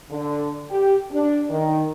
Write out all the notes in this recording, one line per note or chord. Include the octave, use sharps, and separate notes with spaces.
D3
G4
D4
D#3